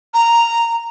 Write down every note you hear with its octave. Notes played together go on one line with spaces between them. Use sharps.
A#5